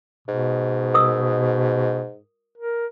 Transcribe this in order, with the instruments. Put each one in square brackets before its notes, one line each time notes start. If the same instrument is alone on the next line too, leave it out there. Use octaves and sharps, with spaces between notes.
[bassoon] G#2 [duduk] B2
[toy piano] A#4 D#6
[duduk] A#4